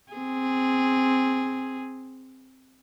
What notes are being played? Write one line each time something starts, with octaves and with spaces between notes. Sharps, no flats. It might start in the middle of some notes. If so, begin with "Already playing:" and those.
C4 G#4